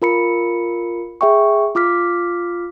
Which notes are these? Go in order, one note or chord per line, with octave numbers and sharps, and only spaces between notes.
F4 A#4 B5 C#7
G#4 E5 G5 C#6
F4 D6 F6 B6